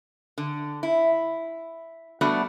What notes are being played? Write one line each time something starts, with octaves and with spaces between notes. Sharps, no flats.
D3
E4
G3 A3 B3 D4 F#4